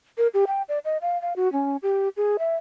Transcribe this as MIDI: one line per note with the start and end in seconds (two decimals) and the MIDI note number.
0.18 0.27 70
0.34 0.44 67
0.47 0.62 79
0.69 0.79 74
0.85 0.98 75
1.02 1.20 77
1.22 1.33 77
1.36 1.51 66
1.52 1.77 61
1.82 2.08 67
2.17 2.37 68
2.39 2.55 76